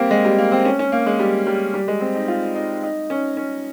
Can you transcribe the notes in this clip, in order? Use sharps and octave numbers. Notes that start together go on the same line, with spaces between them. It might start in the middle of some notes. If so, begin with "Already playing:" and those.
Already playing: G3 A#3 C4
G#3
G3
A#3
C4
C#4
C#4
A#3
G#3
G3
G3
G3
G#3
C4
D#4
F4
D#4
D#4
C#4
C#4